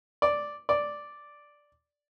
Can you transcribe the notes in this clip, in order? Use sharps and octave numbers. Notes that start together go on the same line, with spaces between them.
D5
D5